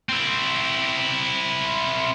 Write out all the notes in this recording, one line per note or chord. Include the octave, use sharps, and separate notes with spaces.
C4 E4